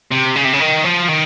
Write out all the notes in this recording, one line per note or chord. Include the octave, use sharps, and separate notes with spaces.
C3
C#3
C3
C#3
D#3
F3
D#3